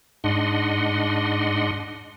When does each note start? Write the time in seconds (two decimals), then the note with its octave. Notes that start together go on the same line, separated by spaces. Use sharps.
0.24 G#2 D4 D#5 F#5 C6